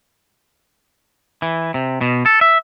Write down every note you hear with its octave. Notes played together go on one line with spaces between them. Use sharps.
E3
C3
B2
A4
E5